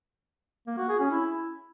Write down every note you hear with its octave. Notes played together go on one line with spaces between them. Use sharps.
A#3
F#4
G#4
C#4
E4